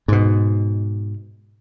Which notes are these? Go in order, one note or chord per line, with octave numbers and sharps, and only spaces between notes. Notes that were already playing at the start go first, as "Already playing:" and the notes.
G#2 B2